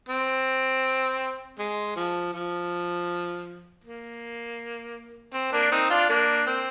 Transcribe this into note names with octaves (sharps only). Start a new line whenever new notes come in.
C4
G#3
F3
F3
A#3
C4
A#3 D4
C4 D#4
D4 F4
A#3 D4
C4